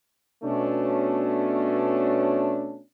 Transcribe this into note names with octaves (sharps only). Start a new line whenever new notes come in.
B2 A3 C#4 D4